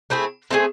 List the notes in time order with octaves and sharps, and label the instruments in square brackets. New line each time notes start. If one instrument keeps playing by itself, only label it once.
[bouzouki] A3 C4 E4 G#4
A3 C4 E4 G#4